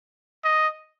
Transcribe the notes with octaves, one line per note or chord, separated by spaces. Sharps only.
D#5